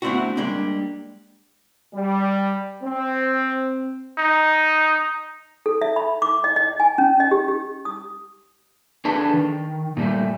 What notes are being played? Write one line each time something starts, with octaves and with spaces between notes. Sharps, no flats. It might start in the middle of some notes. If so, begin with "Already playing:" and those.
A3 B3 C4 D4 E4 F#4
G3 G#3 A#3 D4
G3
C4
D#4
A4
E5
B5
D6
D#5
D#5
G#5
C#4
D#5
G4
G4
D#6
D4 G#4 A4 B4 A5
D#3
A#2 G3 A3